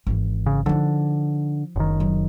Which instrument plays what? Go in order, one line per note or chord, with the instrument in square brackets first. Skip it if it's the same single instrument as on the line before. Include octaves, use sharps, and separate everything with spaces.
[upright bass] G#1 E3
[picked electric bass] C#3
[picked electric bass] D3 [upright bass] F3 D#4
[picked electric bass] F#1 D#3
[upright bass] F#3